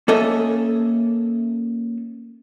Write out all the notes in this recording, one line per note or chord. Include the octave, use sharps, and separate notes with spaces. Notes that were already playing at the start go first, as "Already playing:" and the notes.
A#3 C#4 A4 D#5 E5